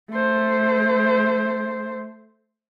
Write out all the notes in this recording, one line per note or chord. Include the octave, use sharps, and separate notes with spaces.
A3 C5